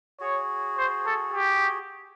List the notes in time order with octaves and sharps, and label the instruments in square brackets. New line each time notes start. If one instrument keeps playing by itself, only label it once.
[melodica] F#4 G#4 [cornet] C#5
[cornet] C5
A4
G4